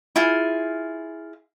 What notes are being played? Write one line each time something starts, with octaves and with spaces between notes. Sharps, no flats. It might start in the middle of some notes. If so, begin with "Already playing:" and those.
E4 F4 G#4